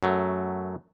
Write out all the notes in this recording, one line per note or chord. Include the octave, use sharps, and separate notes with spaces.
F#2 F#3 A3